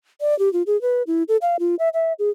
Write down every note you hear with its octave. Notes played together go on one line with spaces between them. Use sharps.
D5
G4
F4
G#4
B4
E4
A4
F5
F4
E5
E5
G#4